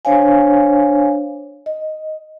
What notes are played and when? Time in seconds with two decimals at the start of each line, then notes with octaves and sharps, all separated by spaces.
0.05 D4 C5 C#5 F5 G#5
1.66 D#5